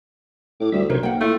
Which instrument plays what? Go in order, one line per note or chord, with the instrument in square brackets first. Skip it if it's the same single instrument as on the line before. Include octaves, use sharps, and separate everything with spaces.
[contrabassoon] A2 [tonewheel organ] D6
[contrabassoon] D2 [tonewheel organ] G3 E5
[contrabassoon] B1 [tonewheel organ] C3 C5 C#5 [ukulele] A#4
[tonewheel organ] A#3 [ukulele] F#5 G5
[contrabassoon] A2 [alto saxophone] A3 [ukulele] F4